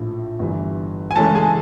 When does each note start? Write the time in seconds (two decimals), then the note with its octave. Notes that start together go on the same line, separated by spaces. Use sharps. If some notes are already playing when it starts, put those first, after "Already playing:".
Already playing: A#1 A2 F3
0.39 G1 G2 E3
1.11 G#5
1.16 F#2 C#3 E3 G#3 C#4 A4 A5
1.35 G#4 G#5